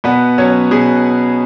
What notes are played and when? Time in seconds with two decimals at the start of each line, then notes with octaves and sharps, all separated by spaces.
0.04 B2 B3 B4
0.38 F#3 C#4 C#5
0.71 B2 G#4